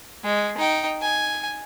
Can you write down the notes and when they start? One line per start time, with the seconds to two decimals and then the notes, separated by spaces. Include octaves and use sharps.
0.24 G#3
0.57 D#4 G5
1.01 G#5